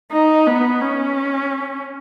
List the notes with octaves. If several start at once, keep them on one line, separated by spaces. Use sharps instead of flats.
D#4
B3
C#4